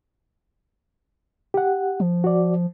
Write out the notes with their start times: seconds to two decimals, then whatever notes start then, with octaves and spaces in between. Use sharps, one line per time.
1.54 G4 F#5
2.00 F3
2.24 F#4 D5